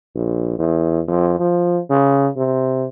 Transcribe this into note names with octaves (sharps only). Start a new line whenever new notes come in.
A#1
E2
F2
F3
C#3
C3